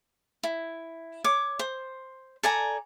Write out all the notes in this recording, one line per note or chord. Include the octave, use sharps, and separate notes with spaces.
E4
C#5 D6
C5
A4 D5 G#5 A#5